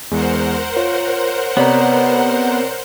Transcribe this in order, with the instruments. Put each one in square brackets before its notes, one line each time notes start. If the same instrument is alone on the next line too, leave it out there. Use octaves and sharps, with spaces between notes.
[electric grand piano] E2 G#3 [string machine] A#4 C5 F#5
[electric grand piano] F4 [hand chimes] C#5
[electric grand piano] C3 B4 [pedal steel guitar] B3 [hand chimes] C#5 D5 A#5